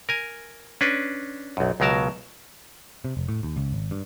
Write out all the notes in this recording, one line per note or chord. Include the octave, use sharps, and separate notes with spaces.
A#4 G#5
C#4 D4 B4
B1 F#2
C#2 B2 F#3 A#4 A5
C3
F1
A2
D#2
C#2
G#1
G2